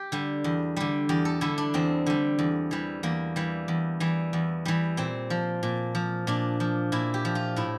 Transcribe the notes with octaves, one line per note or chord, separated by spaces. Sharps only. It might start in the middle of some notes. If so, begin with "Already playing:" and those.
Already playing: G4
D3 G3
E2
D3 G3
E2 G4
A4
D3 G3 E4
D4
E2 C4
D3 G3
E2
E3 G3
E2 A#3
E3 G3
E2
E3 G3
E2
E3 G3
A#2 C4
F3
A#2
F3
A#2 D4
F3
A#2 E4
G4
F3
F4
A2 E4